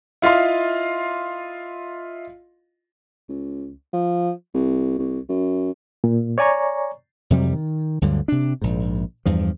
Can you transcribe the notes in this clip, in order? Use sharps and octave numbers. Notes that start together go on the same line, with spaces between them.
E4 F4 D#5 F5 C6
C#2
F3
C2
C2
F#2
A#2
C#5 D5 G#5 A#5 C#6
F2 C3 F#3 G3
D#3
D2 G2 D3 F#3
C3 D4
A#1 G#2
E2 G2 F3